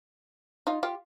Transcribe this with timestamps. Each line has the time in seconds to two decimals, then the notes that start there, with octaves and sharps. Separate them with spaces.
0.67 D#4 F4
0.83 F4 G4